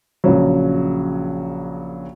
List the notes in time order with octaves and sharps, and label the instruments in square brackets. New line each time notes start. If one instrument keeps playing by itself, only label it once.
[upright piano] A#1 C#3 F#3